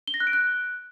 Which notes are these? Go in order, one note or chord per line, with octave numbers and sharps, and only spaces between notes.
G7
A#6
F#6
D7
F#6